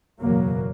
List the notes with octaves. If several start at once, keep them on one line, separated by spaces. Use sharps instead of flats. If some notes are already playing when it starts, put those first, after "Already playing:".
F#1 E2 B2 F#3 A#3